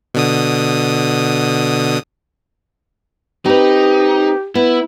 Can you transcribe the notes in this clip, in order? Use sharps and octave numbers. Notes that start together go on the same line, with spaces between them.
B2 D3 D#6
C4 D#4 G4 B4
B3 E4